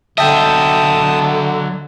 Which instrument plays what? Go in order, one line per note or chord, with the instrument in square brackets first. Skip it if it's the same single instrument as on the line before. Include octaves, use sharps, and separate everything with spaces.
[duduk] D3 [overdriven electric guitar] F#3 D#5 [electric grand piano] E5 G5 [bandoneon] A5 D#6